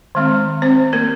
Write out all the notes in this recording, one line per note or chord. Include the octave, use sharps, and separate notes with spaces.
D#3 G#3 C4
C4 C5
A#3 A#4